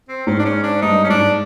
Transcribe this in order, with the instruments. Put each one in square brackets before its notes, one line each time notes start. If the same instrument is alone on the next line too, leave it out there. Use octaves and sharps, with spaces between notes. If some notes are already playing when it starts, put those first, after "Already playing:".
[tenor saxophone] C4
[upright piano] G#2 [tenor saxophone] C#4
[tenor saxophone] D4
C#4
D4
[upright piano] G2 [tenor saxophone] D#4
[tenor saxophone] C#4
[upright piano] G#2 [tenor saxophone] D4